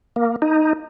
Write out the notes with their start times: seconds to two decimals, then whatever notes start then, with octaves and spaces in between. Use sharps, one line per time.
0.16 A#3
0.42 D#4